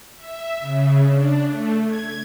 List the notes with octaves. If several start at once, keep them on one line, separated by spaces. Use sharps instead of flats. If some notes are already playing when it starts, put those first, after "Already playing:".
E5
C#3
D4
A3
G#6